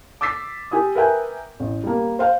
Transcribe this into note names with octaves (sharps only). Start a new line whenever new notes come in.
D6 E6 A6 B6 C7
G4 G#5 D#6
A#4 B4 E5 G5 G#5
A1
G3 A#3
C5 F5 G5